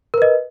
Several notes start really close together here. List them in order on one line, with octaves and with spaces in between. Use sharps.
A#4 B4 D#5